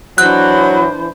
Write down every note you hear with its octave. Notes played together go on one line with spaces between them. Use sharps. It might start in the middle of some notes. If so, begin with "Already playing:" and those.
E3 F#3 D4 C5 F#6